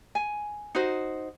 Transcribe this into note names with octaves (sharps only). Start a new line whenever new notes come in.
G#5
D#4 F#4 C5